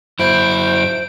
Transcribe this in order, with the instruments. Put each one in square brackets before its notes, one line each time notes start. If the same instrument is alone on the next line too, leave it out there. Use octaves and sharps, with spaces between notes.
[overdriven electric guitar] F#2 E4 [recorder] C5 [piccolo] D7